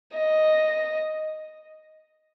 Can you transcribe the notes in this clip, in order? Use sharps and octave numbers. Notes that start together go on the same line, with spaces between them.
D#5